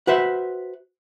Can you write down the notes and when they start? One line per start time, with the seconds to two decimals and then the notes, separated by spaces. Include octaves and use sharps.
0.07 F#4 B4 C5 E5